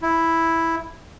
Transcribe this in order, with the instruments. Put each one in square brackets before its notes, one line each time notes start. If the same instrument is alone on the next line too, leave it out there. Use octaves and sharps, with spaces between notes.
[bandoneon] E4